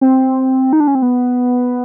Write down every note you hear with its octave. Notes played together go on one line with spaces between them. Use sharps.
C4
D#4
D4
C#4
C4
B3